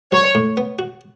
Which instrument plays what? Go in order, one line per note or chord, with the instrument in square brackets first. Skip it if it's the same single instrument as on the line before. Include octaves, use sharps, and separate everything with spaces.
[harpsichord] F#3 [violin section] C#5
[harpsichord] A2
B3
F#4